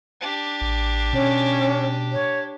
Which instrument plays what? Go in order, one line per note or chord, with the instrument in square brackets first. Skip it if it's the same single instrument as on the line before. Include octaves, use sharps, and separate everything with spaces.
[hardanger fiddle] D4 G4
[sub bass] A1
[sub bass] B2 [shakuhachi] C#4
[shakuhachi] C#5